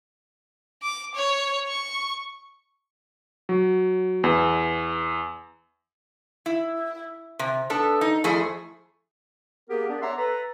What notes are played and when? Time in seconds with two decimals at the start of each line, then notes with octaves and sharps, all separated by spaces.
0.83 D6
1.15 C#5
1.68 C#6
3.49 F#3
4.24 E2
6.46 E4
7.39 C3
7.70 B3 D4 A4
8.01 D#4
8.24 F2 A3 E4 G#4
9.70 A#3 B3 G4 G#4 A#4
9.89 B3 D4
10.02 C#5 E5 F#5 A#5 C6 D6
10.18 A4 B4 A#5